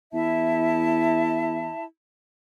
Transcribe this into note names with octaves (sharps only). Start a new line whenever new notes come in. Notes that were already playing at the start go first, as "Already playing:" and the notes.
E2 E4 E5 A5